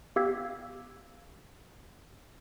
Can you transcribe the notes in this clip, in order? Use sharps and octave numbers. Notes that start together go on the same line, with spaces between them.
B3 G4 F5 E6 G#6 B6